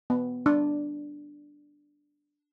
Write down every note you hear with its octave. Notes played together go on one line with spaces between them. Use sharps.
B3
D4